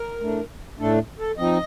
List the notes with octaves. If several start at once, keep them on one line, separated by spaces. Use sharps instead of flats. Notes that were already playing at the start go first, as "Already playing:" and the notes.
Already playing: A#4
A2 A3 D4
A2 A3 D4 A4
A4
F3 C4 D#4 D#5